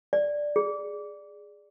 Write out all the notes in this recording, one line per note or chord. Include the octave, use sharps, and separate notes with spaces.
D5
G#4